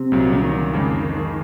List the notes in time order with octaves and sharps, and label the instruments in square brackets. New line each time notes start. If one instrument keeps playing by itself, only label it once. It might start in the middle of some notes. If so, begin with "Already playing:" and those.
Already playing: [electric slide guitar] C3
[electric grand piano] C2 A#2 F#3
[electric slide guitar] C#3
D#3
[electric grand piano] F2 C#3 G#3